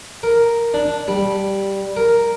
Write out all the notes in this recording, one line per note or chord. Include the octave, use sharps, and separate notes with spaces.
A#4
D4
G3
A#4